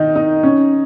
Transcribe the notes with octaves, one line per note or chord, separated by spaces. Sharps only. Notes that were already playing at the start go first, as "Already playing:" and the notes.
Already playing: D#3 D#4
D#4
C#4